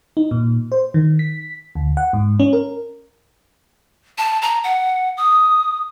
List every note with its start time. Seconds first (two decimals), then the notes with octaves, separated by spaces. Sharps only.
0.17 D#4
0.31 A#2
0.72 C5
0.94 D#3
1.19 B6
1.75 D2
1.97 F#5
2.13 G#2
2.40 C#4
2.53 A#4
4.18 A5
4.42 A#5
4.64 F#5
5.17 D#6